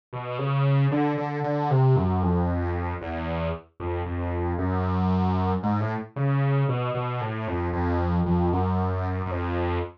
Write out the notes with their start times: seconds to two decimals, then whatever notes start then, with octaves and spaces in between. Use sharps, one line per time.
0.13 B2
0.39 C#3
0.91 D3
1.18 D3
1.44 D3
1.70 C3
1.96 F#2
2.23 F2
3.01 E2
3.80 F2
4.06 F2
4.58 F#2
5.63 G#2
5.80 A2
6.16 C#3
6.69 B2
6.94 B2
7.21 A2
7.47 F2
7.73 F2
8.26 F2
8.53 F#2
9.26 F#2
9.31 F2